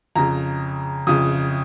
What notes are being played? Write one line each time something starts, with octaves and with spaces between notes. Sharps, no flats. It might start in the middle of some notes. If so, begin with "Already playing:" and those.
F2 C#3 A#5
F2 C#3 D#6